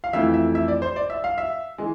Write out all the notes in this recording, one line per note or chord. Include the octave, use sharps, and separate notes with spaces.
F5
F2 E3 A3 E5
E5
E5
D5
C5
D5
E5
F5
E5
E3 G#3